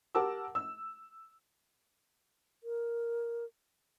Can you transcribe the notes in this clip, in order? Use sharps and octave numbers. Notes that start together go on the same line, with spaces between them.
G4 A#4 F#5 A5 D6 E6
E6
A#4